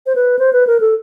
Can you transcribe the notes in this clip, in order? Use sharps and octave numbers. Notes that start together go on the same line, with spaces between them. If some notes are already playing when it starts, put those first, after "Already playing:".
C5
B4
C5
B4
A#4
A4